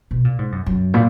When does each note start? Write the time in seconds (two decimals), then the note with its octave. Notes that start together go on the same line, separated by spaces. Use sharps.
0.11 B2
0.25 A#2
0.39 G#2
0.52 F#2
0.66 F#2
0.94 A#2